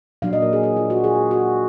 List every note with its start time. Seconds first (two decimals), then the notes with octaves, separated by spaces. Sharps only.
0.22 A#2 F#3 D4 F5
0.33 D#5
0.42 A#4
0.53 G#4
0.63 G#4
0.76 F4
0.90 F#4
1.04 G#4
1.31 F#4